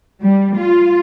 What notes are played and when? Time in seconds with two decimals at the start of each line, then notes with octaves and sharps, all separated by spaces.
0.23 G3
0.59 F4